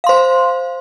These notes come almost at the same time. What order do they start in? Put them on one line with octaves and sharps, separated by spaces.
F5 C6 C5